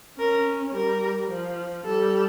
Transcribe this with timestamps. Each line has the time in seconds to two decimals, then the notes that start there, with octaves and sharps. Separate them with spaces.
0.18 C#4 A#4
0.75 G3 A#4
1.29 F3
1.85 G3 A4